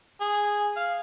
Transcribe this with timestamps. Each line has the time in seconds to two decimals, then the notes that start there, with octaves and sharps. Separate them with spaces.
0.21 G#4
0.77 F5